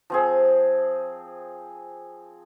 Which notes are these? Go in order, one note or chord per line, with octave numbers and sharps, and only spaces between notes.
F3 C4 G#4